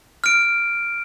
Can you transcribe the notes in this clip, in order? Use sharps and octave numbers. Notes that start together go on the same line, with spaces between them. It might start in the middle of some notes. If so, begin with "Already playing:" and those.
F6 D7